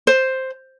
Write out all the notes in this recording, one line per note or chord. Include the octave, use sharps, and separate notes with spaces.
C5